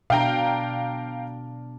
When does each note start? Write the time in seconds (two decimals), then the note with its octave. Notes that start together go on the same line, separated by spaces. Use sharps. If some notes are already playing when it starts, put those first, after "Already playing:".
0.10 B2 D4 F5 G5 A#5